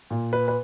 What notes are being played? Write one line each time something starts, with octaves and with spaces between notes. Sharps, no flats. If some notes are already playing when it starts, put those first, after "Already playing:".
A#2
B4
B4